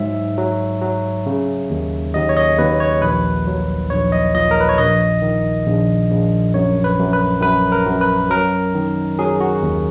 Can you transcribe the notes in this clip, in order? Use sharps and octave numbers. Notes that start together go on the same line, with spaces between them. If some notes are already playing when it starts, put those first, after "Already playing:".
Already playing: G#2 F#3 E5
F#3
F#3
C#3
D#2
D#2 D#5
C#5
D#5
D#2 B4
C#5
A#1 B4
F#3
A#1 C#5
D#5
A#2 D#5
A#4
B4
C#5
A#1 D#5
D#3
A#1
A#1
F#2 C#5
B4
F#2
B4
F#2 B4
A#4
F#2
B4
F#3 A#4
D#3
F#3 G#4
F#4
D#2